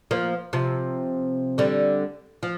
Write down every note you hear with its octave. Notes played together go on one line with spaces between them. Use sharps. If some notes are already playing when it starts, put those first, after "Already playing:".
F3 A#3
C3 F3
D3 G3
F3